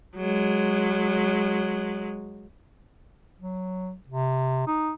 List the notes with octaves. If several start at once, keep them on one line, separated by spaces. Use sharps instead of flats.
F#3 G#3
F#3
C3
D#4